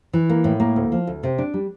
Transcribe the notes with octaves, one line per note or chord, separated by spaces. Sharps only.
E3
A#3
A2
A#3
D2
F3
D2
C3
D4
G3